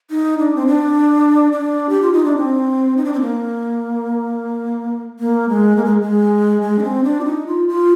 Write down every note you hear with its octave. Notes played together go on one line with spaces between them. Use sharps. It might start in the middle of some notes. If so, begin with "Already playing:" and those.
D#4
D4
C4
D4
D4
G4
F4
D#4
D4
C4
D#4
D4
C4
A#3
A#3
G#3
A#3
G#3
G#3
G#3
D4
C4
D4
F4
D#4
F4
F4